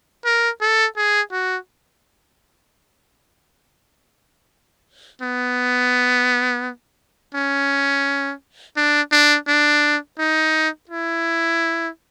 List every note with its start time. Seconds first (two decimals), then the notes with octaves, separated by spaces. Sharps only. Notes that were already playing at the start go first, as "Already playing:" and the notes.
0.25 A#4
0.61 A4
0.96 G#4
1.32 F#4
5.22 B3
7.34 C#4
8.77 D4
9.12 D4
9.47 D4
10.19 D#4
10.89 E4